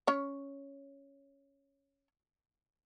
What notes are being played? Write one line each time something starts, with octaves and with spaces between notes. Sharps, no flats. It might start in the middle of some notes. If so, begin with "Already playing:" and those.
C#4 C#5